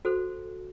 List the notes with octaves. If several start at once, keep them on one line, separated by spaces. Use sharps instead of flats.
F#4 A4 C5